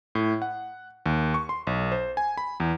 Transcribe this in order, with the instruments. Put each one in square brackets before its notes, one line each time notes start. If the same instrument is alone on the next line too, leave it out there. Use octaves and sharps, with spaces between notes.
[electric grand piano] A2
F#5
D#2
C#6
C6
B1
C5
G#5
B5
E2